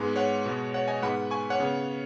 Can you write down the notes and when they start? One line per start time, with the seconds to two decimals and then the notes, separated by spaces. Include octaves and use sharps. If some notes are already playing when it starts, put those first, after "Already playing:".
Already playing: G#2 G#3 B3
0.16 C#5 F#5
0.45 B2 G#3 B3
0.74 C#5 F#5
0.88 D#5 G#5
1.02 G#2 G#3 B3 F#5 B5
1.31 G#5 C#6
1.50 C#5 F#5
1.60 C#3 B3